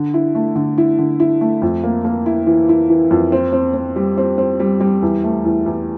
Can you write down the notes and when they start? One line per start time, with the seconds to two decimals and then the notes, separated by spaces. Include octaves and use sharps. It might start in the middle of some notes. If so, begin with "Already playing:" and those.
Already playing: D3
0.14 E4
0.35 A3
0.56 D3
0.78 E4
0.99 D3
1.20 E4
1.41 A3
1.62 F2
1.84 A#3
2.05 A#3
2.26 E4
2.47 E3
2.69 E4
2.90 E3
3.11 F2
3.32 C4
3.53 C4
3.74 C4
3.96 G3
4.18 C4
4.38 C4
4.60 G3
4.81 G3
5.02 E2
5.24 A3
5.45 E2
5.66 E2